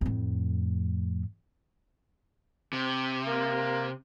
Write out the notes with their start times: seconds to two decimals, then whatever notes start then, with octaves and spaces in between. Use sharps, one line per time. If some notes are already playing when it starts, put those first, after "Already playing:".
0.01 F2 A2
2.73 C3
3.27 A#3